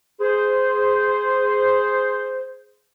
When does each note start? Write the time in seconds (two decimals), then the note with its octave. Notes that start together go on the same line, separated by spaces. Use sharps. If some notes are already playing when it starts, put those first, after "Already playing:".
0.20 G#4 C5